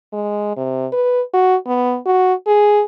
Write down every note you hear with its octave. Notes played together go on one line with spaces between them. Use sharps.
G#3
C3
B4
F#4
B3
F#4
G#4